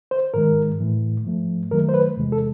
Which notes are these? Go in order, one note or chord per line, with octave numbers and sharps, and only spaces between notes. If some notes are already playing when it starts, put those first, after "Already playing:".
C5
G#2 D#3 G#3 A#4
A2 E3 A3
G#2 F3 A3
F#2 D#3 F#3 A3 A#4
C5
B4
E2 C3 E3 G#3
A4